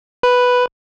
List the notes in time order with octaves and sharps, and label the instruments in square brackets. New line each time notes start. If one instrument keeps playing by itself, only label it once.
[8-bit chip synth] B4